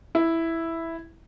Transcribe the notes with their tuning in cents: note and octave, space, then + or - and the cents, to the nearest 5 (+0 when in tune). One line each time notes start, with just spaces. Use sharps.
E4 +0